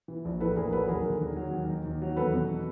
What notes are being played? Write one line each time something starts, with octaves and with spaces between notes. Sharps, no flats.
E3
A#1
A2 A4 B4
A#1 G#4 A#4
F#3 A4 B4
D#2 G#4 A#4
D3
D#2
F#3
D#2
D#3
D#2
F#3
E2 A4 B4
B2